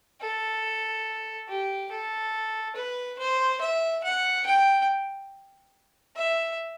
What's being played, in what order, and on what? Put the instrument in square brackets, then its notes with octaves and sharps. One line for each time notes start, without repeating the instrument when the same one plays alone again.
[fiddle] A4
G4
A4
B4
C5
E5
F#5
G5
E5